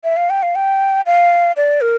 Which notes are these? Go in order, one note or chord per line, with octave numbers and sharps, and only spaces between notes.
E5
F5
G5
F5
G5
F5
D5
A#4